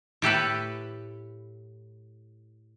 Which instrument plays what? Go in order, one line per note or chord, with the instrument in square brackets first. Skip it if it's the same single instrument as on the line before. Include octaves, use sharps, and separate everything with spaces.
[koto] A2 G4 A4 B4